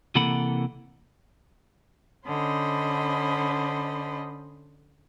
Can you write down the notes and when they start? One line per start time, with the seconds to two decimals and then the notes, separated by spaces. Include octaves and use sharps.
0.15 C3 E3 A#3 A4 F#5 B5
2.26 D3 C#4 C5 D#5 B5